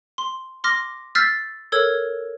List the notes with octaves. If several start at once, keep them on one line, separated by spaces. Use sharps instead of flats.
C6
C6 D6 F6 A#6
E6 F6 G6 A6 B6 C7
A4 A#4 C#5 E6 G#6